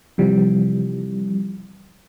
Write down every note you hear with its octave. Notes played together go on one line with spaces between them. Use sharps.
C3 E3 F3 G3